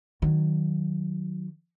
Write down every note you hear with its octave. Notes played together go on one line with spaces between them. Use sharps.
D#3 F#3